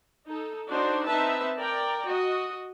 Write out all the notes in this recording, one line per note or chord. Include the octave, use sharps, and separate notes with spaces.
D#4 A4
D4 D#4 F#4 C5
C4 D#4 B4 E5 A5
A#4 D5 G5 A#5
F#4 D#5